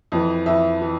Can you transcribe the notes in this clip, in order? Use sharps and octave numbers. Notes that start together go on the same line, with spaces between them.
F2 E3
F2 E3 E5
E3